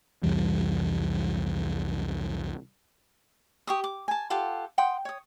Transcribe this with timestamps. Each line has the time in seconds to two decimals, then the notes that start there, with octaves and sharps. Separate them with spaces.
0.23 C2 F2 E3 G3
3.67 G4 C#6 D#6
3.84 D6
4.08 G#5 A5
4.30 F4 G4 A4 F#5
4.78 F#5 G5 C6 D#6
5.05 C#5 D#6